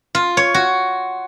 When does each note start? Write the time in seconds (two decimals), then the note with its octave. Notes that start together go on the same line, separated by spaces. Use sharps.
0.15 F4
0.37 C#5
0.54 F#4